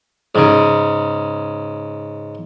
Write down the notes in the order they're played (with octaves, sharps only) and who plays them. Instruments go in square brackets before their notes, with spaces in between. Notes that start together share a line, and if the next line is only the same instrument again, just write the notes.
[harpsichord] G#2 C#3